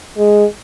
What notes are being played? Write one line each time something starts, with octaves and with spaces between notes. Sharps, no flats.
G#3